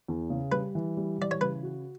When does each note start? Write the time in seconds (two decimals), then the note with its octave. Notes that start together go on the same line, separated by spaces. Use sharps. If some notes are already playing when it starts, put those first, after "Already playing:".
0.08 E2
0.30 C#3
0.52 G3 B4
0.75 E3
0.97 G3
1.19 E3 D5
1.31 C#5
1.41 C#3 B4
1.63 F#4